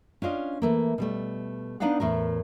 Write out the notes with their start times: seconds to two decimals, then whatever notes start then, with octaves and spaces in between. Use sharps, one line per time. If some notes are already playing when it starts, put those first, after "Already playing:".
0.22 C#4 D4 F4 D#5
0.62 E3 A3 A#3
0.98 B2 G3 A3
1.80 B3 D4 D#4 D5 F5 F#5
2.00 E2 A2 A3 A#4